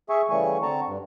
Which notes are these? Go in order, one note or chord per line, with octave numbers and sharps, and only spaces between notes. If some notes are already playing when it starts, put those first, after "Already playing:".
G#4 E5 G#5 C#6
C#3 E3 G3 A3 G#5 C#6
D3 C4 A5 A#5 C#6
G2